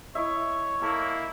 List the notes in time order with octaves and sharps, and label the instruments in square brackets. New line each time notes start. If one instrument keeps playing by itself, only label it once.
[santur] E4 D#5 E5 [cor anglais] C#5
[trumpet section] A#3 E4 [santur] A4